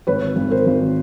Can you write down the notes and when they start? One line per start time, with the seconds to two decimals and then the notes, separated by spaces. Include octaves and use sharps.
0.07 G#1 B4 C#5
0.36 G#1
0.50 A#4 C5
0.66 G#1